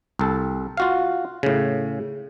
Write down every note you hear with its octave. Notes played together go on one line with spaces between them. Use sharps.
C2 A4
F4 F#4 F5
A2 C#3